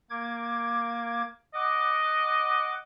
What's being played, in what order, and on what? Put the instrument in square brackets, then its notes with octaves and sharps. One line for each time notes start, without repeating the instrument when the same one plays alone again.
[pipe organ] A#3 D6 G#6
[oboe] D#5 [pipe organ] F#5 D6